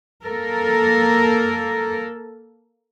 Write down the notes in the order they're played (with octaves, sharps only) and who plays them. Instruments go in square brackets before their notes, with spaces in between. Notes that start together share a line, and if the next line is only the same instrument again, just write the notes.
[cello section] A#3 A4 A#4